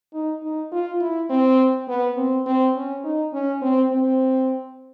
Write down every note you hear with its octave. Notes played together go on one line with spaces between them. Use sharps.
D#4
D#4
F4
E4
C4
B3
C4
C4
C#4
D#4
C#4
C4
C4